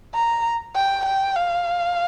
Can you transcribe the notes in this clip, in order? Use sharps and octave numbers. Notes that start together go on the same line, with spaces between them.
A#5
G5
G5
F5